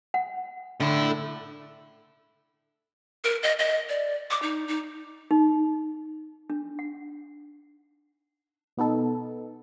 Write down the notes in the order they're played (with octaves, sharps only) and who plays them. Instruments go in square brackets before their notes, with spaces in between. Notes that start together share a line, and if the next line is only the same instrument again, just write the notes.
[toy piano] F#5
[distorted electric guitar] A2 E4 [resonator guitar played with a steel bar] D3
[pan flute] A#4
D#5
D#5
D5
D6
D#4
D#4
[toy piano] D#4
D4
F#5
[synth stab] B2 B3 D#4 A4